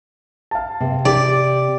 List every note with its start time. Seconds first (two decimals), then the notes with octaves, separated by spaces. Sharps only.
0.51 F5 A5
0.80 C3
1.05 G4 D5